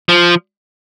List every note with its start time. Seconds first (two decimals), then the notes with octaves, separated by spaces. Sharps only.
0.09 F3